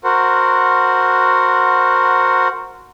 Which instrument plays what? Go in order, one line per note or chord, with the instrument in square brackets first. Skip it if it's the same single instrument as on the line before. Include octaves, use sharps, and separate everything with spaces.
[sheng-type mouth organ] F#4 A#4 C5 F#5